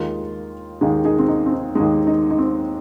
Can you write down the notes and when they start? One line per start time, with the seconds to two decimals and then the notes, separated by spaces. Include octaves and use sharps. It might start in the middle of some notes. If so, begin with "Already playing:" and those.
Already playing: D#2 D#3 G#3 F4 A#4
0.81 D#2 D#3 G#3 D#4 G#4
1.05 D#4 G#4
1.19 C4
1.28 D#4
1.46 C4
1.52 D#4
1.75 D#2 D#3 G#3 D#4
2.07 D#4
2.30 D#4
2.38 C4